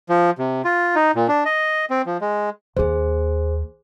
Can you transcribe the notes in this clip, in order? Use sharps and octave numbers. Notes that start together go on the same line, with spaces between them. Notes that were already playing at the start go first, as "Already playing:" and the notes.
F3
C3
F4
D#4
A#2
D4
D#5
C4
F3
G#3
D#2 A#3 G#4 C5